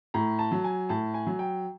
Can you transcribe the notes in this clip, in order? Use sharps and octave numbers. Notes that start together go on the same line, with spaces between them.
A2 A#5
A5
F#3
G#5
A2 A5
G#5
F#3
G5